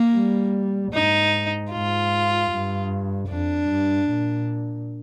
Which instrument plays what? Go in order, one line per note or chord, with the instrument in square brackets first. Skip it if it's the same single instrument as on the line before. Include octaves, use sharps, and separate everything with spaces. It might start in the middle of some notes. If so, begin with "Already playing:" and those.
Already playing: [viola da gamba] A#3
[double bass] G3
[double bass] G#2 [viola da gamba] D#4
[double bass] G#2 [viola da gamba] F4
[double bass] G2
[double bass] F2 [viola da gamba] D4
[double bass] G2
A#2